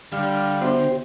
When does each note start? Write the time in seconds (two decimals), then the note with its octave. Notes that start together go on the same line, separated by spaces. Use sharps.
0.13 D3 G3 F5
0.61 B3 F#4 G4 C5 E5